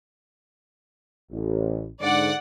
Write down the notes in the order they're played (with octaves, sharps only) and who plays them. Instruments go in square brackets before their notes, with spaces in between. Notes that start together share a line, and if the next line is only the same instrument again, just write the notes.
[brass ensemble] A1
[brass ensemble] G#2 D3 [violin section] D5 F#5